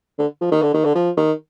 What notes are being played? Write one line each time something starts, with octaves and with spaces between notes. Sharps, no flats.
D3
F3
D#3
D3
D#3
D3
F3
D#3